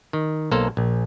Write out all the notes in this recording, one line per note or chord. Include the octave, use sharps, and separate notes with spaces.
D#3
B1 A#3 A4 C5
A#1